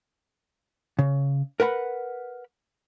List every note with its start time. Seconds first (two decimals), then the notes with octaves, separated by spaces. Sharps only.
0.99 C#3
1.60 A#4 B4 F#5 A#5 B5